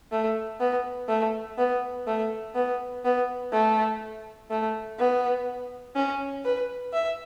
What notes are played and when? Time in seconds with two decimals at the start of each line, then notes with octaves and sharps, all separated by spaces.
0.12 A3
0.60 B3
1.09 A3
1.58 B3
2.07 A3
2.55 B3
3.04 B3
3.52 A3
4.50 A3
4.99 B3
5.96 C#4
6.45 B4
6.93 E5